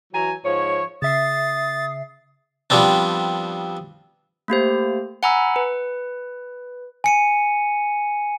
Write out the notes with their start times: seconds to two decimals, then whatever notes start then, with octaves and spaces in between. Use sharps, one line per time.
0.13 E3 F#3 G#5 A#5
0.45 G#2 F3 C#5
1.02 C#3 E5 D#6 A6 C7
2.70 F3 G3 B3 C4 D4
4.48 A3 A#3 G4 C5
5.23 F#5 G#5 A#5 B5 E6
5.56 B4
7.04 G#5 C#7 D#7